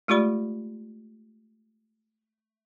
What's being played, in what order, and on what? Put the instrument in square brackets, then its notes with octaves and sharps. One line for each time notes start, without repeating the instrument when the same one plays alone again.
[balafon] G#3 A3 F4 G4 D5 B5